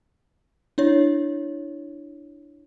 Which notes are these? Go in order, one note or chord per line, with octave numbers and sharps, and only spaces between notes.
D4 E4 C#5